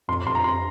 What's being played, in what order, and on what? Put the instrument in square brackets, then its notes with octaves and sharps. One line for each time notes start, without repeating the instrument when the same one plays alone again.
[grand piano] F2 [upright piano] C6
[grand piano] F2 [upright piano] C6
[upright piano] A#5
[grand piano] F2 [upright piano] C6